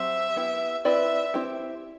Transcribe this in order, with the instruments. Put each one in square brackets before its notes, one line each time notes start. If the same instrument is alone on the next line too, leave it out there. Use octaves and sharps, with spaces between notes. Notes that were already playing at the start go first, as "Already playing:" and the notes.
Already playing: [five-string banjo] F#3 C4 G4 [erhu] E5
[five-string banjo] B3 E4 G4
[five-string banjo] C4 E4 B4 D5 [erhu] E5
[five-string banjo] C4 E4 G4